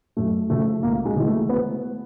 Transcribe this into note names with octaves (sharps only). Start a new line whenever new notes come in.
F#2 A3
C#3 F3 A3
C#2 A#3
G#3
C#3 E3
A3
B3